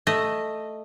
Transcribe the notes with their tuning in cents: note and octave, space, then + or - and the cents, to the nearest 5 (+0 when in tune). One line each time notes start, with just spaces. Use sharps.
A3 +0 D#5 -10